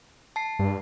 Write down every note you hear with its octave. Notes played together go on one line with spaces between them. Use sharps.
A5 C7
G2